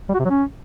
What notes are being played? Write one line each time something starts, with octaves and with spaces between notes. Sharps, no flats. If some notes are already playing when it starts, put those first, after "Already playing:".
G3
F#4
C3
F#3
C#4